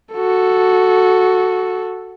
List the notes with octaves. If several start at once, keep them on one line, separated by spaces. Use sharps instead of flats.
F#4 A4